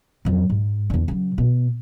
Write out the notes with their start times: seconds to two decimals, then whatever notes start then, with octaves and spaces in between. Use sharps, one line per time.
0.25 F2 F#3
0.50 G#2
0.90 E2 D3
1.08 C#3 F#3
1.38 B2